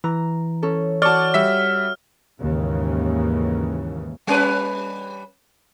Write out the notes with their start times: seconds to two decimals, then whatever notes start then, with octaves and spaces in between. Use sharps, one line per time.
0.04 E3 A#5
0.63 C#4 A4
1.02 F#4 C#5 D5 A5 F6
1.34 G3 E5 E6 B6
2.39 D#2 G#2 C#3 E3
4.27 G3 C#4 B4